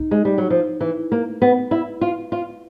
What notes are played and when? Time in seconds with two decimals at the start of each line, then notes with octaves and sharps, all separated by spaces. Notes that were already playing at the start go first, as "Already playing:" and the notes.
Already playing: D#4
0.11 G#3
0.25 G3
0.38 F#3
0.50 F3
0.81 E3
1.12 A#3
1.42 B3
1.71 E4
2.01 F4
2.32 F4